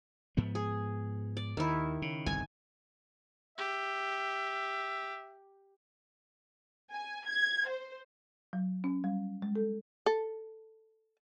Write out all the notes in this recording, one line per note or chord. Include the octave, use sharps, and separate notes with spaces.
G#2 F3 B3
G#4
D5
D#2 D#3 E4
C#3
G1 C2 F2 G#5
G4 E5
G#5
G#6
C5
F#3
C#4
G3
G#3
A4
A4